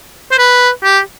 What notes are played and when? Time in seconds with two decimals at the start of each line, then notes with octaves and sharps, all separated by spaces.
0.32 C5
0.38 B4
0.83 G4